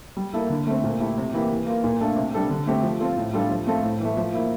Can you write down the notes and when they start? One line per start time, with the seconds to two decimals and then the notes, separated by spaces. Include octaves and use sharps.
0.17 G3
0.34 A#3 E4 A4
0.50 D3
0.67 A3 C4
0.84 A#2
1.00 A3 E4 G4
1.17 C3
1.33 E3 A#3 E4 G4
1.50 E3
1.66 A#3 F4
1.84 A#2
2.01 A3 D4 F4 A4
2.16 C3
2.34 G3 D4 A4
2.50 D3
2.67 A3 C4 G4
2.83 F3
3.00 C4 F4 A4
3.17 A2
3.33 G3 D4 F4 A4
3.51 F3
3.67 A3 C4 F4 A4
3.83 A2
4.00 E3 A3
4.17 F3
4.33 A#3 E4